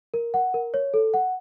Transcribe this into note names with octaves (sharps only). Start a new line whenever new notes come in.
A#4
F#5
A#4
C#5
A4
F#5